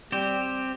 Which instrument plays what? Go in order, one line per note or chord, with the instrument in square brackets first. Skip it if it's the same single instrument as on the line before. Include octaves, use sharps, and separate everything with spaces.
[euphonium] G3 [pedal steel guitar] C4 G4 C5